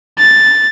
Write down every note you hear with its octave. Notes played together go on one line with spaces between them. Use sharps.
A6